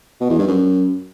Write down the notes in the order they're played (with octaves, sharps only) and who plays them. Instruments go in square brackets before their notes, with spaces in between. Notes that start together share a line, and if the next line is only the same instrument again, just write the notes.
[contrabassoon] B2
E2
G2
F#2